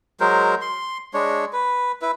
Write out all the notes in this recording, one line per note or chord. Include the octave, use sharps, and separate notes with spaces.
F#3 G#3 A#4 C5
C6
G#3 D4 C#5
B4
E4 B4